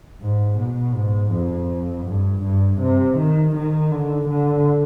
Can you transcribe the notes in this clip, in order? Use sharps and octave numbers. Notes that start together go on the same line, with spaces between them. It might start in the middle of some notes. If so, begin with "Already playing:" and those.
G#2
B2
G#2
F2
G2
G2
C3
D#3
D#3
D3
D3